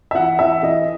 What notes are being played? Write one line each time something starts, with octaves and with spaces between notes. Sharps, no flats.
E5
E3 F#5
E3 E5
E3 D#5